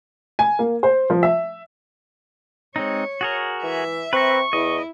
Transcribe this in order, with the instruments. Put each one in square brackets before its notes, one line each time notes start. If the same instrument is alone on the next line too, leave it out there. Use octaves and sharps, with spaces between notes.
[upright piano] G#5
A#3
C5
F3
E5
[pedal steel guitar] G#3 C4 D#4 [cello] C#5
[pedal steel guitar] F#4 G#4 A#4
[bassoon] E3 [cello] E5
[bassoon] C4 [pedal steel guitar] B4 A#5 [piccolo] C#6
[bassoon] E2 [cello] E4 [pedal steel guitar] D#5